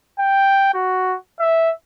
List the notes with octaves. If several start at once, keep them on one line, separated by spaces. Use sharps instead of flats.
G5
F#4
E5